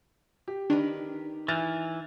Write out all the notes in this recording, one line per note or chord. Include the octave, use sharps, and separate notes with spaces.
G4
D#3 D4 A#4 B4
E3 F6 G6 A6